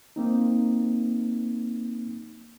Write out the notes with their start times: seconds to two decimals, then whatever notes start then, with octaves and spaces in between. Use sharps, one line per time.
0.16 A#3 C4 D#4